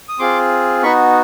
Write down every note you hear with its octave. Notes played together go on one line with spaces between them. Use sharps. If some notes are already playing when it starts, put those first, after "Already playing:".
D#6
C4 F4 G#4 C6 D6
B3 D#4 F#4 B5 C#6